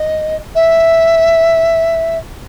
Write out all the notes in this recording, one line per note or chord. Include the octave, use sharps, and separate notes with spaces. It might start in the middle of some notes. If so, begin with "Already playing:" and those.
Already playing: D#5
E5